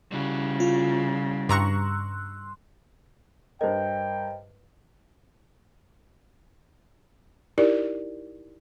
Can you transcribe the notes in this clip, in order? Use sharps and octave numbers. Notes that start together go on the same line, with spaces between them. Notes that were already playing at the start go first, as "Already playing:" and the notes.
C#3 G3 E4 F#4
F4
G2 A#5 C6 C#6 E6 F#6
G2 A#4 C5 D#5 G5
D#4 E4 G4 A#4 D5